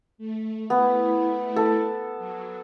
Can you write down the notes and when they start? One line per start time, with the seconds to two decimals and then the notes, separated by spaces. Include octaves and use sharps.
0.18 A3
0.70 A3 B3 E4
1.56 A4
2.17 F#3